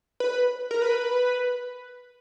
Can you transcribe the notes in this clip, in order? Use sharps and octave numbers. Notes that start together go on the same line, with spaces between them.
B4
A#4
B4